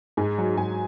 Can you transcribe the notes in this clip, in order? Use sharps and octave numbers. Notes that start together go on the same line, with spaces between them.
G#2 G#5
F#3
G#2 G#5